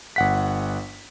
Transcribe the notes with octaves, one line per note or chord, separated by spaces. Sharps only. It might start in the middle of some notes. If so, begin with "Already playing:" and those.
G1 F#5 B6